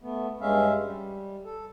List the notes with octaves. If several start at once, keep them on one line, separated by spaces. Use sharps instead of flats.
A3 B3
G2 G#3 C#4 E5 F5
G3
A4